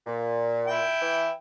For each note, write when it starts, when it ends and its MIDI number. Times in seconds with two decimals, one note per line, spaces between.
0.06 0.87 46
0.66 1.32 64
0.66 1.32 79
1.01 1.29 52